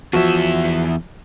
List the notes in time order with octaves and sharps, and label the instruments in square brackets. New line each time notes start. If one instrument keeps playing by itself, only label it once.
[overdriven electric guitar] E2 E5 [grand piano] F3 F#4